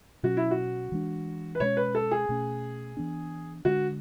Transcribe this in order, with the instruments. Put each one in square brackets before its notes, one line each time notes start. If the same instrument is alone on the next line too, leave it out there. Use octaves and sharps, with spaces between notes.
[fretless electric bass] B2 F#3 C#4 [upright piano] F#4
[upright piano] E4
F#4
[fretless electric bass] E3 G#3 D4
[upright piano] B4
[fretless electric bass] B2 G#3 C#4 [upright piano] C#5
[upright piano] B4
A4
G#4
[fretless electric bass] B2 A3 C#4
E3 B3 D4
[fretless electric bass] D3 G#3 B3 D4 [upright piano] F#4